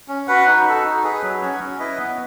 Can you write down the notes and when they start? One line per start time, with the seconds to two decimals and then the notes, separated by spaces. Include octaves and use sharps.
0.08 C#4
0.28 F#4 B4 F#5
0.46 D#4
0.66 F#4 A4
0.84 D#4
1.03 G#4 B4
1.23 F#3
1.41 C#4 F#4 C#5
1.60 C#4
1.79 E4 B4 D#5
1.99 B3